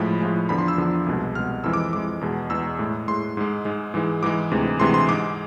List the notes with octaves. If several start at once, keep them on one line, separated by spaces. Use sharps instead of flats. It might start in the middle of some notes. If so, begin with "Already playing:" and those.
Already playing: A2 F3 G#3 B5
A2 F3 G#3
E2 D3 F3 B5
C6
E6
E2 D3 F3
C2 B2 G#3
C2 B2 G#3 F6
F2 E3 G#3 E6
D6
F2 E3 G#3 D6
E2 B2 G#3
E2 B2 G#3 E6
A2 G#3
A2 G#3 C6
G#2 G#3
G#2 G#3
G#2 E3 G#3
G#2 E3 G#3 D6
D2 C3 E3 G#3
D2 C3 E3 G#3 C6
C6
G#2 G#3 D6